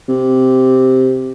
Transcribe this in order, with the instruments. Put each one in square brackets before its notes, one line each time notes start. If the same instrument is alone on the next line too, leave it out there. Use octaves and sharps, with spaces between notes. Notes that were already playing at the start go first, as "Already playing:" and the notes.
[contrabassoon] C3